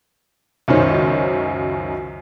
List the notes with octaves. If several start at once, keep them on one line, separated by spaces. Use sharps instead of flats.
C#2 F#2 D#3 D#4 C5 C#5